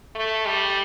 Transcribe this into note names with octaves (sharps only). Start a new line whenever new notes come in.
A3
G3